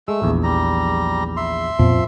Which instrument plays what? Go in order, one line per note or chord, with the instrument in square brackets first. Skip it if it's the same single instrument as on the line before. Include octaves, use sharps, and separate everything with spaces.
[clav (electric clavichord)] G#3 [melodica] A3 E6
[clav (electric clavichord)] A#1 E2
[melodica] G3 A#5
E5 C6
[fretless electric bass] F2 A#2 B3 [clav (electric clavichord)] F3